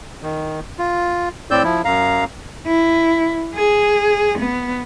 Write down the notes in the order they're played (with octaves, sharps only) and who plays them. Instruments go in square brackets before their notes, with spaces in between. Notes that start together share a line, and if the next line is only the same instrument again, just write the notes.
[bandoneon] D#3
F4
A2 C4 D5 E6 G6
F3 E4
F#2 F5 A#5
[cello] E4
G#4
B3